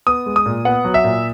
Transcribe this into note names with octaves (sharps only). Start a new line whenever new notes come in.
B3 D#6
G#3
D#6
A#2
B3 F#5
F#3
E5
A#2